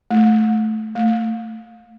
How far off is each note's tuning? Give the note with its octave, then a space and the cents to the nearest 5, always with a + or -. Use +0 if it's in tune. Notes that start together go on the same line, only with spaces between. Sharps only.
A3 -10
A3 +25